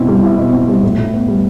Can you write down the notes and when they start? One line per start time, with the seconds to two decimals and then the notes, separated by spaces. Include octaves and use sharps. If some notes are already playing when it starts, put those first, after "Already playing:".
Already playing: B2 C4 E4
0.08 G3
0.23 E4
0.38 B2
0.52 C4
0.68 G3
0.83 A2
0.98 A2
1.14 B3
1.28 G3